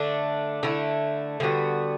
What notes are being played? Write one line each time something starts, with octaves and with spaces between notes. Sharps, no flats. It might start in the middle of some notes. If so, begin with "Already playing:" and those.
Already playing: D3 A3 D4
D3 A3 E4
D3 G3 B3 F#4